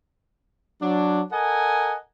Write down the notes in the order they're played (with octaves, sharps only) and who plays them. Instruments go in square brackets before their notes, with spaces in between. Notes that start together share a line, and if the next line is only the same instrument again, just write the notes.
[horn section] F#3 D4
A4 A#4 D#5 F#5 G#5